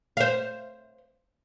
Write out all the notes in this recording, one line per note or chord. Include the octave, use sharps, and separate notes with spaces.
C5 F5